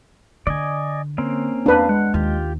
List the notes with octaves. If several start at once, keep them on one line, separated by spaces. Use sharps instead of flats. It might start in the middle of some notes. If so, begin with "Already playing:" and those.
D3 D5 D#5 G#5
A#3 C4 C#4
E2 D4 B4 F5
G#3 F#5
D#2 F4 G4